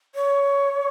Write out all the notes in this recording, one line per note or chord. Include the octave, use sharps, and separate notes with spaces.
C#5